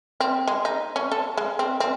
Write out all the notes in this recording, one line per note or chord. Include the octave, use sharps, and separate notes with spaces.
C4
G#3
D#4
C#4
A4
G#3
C4
C4